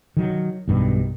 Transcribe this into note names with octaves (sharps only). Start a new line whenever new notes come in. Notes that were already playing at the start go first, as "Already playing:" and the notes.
D#3 F#3
B1 G2 B2 D#3